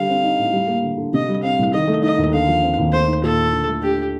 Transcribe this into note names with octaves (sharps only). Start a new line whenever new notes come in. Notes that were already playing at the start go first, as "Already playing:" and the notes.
Already playing: D3 G3 F5
C4
D#4
A2
G3
A#3
D3
D3
C3 D#5
G3
C4 F5
C2
D#3 D#5
A3
D#4 D#5
D#2
D3 F5
F3
C4
D#2
A3 C5
D#4
A#2 A4
A#2
D3
A3
D4 G4